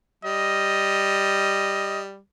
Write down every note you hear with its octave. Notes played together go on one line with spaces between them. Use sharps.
G3 D#5